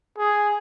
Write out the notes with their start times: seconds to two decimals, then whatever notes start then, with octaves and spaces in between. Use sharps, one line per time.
0.18 G#4